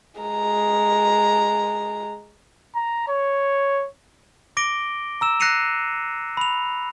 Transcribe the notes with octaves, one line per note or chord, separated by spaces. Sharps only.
G#3 A#5
A#5
C#5
D6 A#6 D7 G7
A#5 E6 E7
F#6 A#6 C7 C#7 D#7 F7
B5 F7